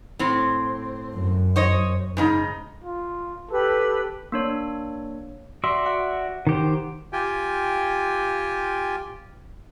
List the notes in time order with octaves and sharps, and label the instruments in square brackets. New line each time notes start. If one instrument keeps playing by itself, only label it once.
[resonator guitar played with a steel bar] A2 C4
[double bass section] F#2
[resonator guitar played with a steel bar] C5 C#5 D#5
G#2 C#3 D#4
[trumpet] F4
[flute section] G4 B4 E6 [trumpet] A4
[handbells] A#3 D4 C#5
[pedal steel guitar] F#4 D5 E5 [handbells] C6
[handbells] F#5
[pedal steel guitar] D#3 G4 C5
[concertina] F4 G4 G5 G#5